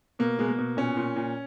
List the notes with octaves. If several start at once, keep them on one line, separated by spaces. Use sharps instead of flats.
B2 A#3
B2 G#3
A#3
B2
A#2 C#4
A#2
A#2